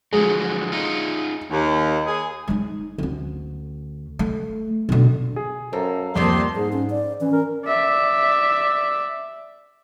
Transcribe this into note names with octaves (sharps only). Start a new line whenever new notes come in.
D3 F3 F#3 G#3
D#4 F4
D#2
G#4
G#3 D#4
D2 C#4
A3
B2 D3
G#4
F#2 A#3 A4 C5
F2 D#3 G3 A3 A#3 D4 C5 C6
G#2 G#4
C#4
D5
E3 C#4
A#4
D5 E5